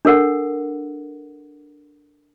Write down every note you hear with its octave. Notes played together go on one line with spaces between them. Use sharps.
D4 A4 A#4 F#5